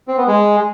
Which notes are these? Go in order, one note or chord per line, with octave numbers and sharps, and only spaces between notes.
C4
B3
G#3